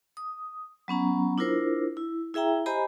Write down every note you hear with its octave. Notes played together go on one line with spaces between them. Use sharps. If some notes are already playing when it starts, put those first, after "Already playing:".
D#6
F#3 B3 C#4 A#5
D4 E4 F4 A#4 C5
E4
E4 G#4 E5 G5 A#5
G4 C5 D#5 G#5 A#5 B5